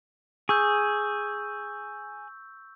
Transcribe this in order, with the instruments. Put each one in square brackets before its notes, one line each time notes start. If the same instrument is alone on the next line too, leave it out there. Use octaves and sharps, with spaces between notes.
[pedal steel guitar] G#4 [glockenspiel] C#6 E6 G6